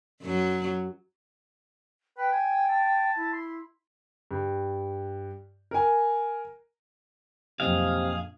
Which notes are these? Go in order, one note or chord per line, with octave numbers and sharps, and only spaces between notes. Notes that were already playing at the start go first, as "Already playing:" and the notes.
F#2 F#3
B4 G5
G#5
A5
E4
C6
G2
A#4 G#5
A#1 F2 C3 F#3 G#4 D#5 F5